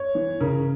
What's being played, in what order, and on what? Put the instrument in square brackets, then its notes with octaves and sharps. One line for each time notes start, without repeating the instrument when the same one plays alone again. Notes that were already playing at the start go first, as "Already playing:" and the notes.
Already playing: [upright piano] C#5
E3
C#3 A#4